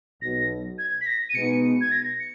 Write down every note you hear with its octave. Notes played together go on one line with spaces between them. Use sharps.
B1 B2 F#3 A#6
G#6
B6
A#6
D#7
B2 G#3 B3 D#4 C#7
G#6
A#6
C#7